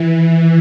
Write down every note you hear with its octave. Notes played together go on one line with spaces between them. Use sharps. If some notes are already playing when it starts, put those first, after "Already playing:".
Already playing: E3